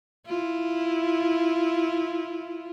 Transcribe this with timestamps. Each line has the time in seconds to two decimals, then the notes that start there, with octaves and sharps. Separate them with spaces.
0.26 E4 F4